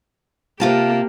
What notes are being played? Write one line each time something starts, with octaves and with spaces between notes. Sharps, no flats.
C3 A#3 F4 G4 A5